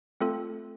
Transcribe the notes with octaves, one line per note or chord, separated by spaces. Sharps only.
A3 C4 F4 A4